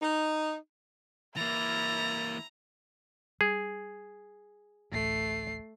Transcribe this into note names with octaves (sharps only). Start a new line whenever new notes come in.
D#4
E3 A#3 E4 A#5 A6
G3 G#4
D1 A1 A3 C7